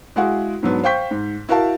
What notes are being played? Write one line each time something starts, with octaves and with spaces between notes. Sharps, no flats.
G#3 E4 F#4 G#4 F5 F#5
G#2 F#3 B3 D4
C5 F5 G5 C#6 G6 B6
G#2
E4 F#4 A#4 F5 A5